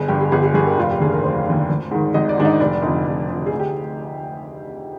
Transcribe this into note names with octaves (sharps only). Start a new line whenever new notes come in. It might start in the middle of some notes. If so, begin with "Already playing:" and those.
Already playing: G1 G#4
G2 D3 G4
G#4
G1 G#4
G#4
G2 D3 G#4
A#4
F1 F4
G4
D#2 D3 G#4
A#4
F1 C5
D#2 D3
G#1
G#2 D#3
G#1 D#5
D5
G#2 D#3 D4
D#4
F1 D5
F2 D3 D#4
F1
F2 D3
G#4
D2
G4